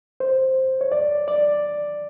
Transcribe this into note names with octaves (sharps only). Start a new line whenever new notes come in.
C5
C#5
D5
D5